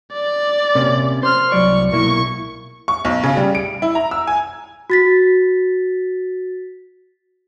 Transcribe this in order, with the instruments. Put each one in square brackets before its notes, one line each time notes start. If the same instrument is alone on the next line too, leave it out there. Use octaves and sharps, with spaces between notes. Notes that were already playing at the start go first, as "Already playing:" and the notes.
[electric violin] D5
[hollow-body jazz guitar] C3 A#3 C#4
[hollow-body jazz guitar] C5 [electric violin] C6 F6
[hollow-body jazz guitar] C2 F#3 D5 [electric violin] C#6
[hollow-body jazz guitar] B1 A#3 E4 [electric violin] C#6
[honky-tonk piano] C#6
B1
C#3
G3
D7
E4
A#5
E6
G#5
[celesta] F#4 A6 B6